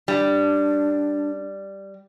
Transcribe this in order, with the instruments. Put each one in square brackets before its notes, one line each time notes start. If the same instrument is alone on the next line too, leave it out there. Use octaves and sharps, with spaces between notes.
[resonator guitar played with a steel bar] G3 [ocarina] D4